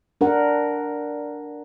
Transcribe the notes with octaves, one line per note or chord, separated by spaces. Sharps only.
D4 A#4 F#5